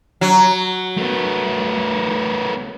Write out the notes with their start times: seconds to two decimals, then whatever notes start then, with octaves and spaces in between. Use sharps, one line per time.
0.21 F#3
0.98 A3 B3